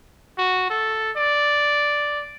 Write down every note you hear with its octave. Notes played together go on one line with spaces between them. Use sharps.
F#4
A4
D5